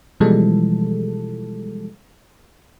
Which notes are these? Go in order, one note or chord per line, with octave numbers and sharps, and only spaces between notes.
B2 E3 F3 G3 G#3 A4